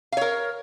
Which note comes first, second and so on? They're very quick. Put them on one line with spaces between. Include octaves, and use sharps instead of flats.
F5 C#5 A#4